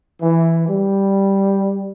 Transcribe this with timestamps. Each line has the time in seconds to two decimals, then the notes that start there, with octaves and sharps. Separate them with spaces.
0.22 E3
0.69 G3